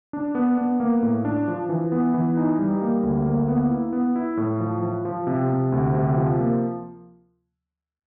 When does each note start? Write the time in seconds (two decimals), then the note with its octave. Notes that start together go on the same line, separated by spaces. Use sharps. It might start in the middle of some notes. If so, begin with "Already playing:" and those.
0.13 D4
0.35 B3
0.58 B3
0.80 A#3
1.02 A2
1.25 D4
1.48 F3
1.69 E3
1.92 B3
2.14 E3
2.37 D#4
2.59 G3
2.82 A#3
3.03 D2
3.26 A#3
3.48 B3
3.70 E4
3.93 B3
4.16 E4
4.37 A2
4.60 F3
4.82 F3
5.05 F3
5.27 C3
5.50 C3
5.72 D2
5.95 C3
6.16 F3
6.40 A#3